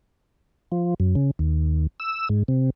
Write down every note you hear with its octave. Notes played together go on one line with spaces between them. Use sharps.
F3
F#2
C#3
D#2
E6
G#2
C3